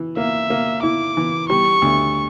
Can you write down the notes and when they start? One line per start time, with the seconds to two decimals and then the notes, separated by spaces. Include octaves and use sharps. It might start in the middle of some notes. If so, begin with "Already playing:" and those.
Already playing: E3
0.17 A#3 E5
0.50 A#3
0.83 E4 D6
1.17 E3
1.49 G3 C#6
1.82 D2